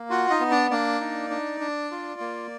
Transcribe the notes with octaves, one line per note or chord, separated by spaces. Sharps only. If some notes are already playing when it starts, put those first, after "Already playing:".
Already playing: A#3
F4 F#4 F#5
D#4 D#5
B3
D4 D5
A#3 D4 D5
D#4
D4
D4
F4
A#3